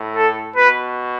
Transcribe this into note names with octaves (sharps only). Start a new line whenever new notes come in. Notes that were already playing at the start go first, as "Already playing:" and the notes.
Already playing: A2
A4
B2 B4